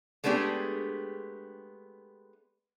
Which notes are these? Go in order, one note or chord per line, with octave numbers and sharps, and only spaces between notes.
G#3 A3 B3 D4 G4 G#4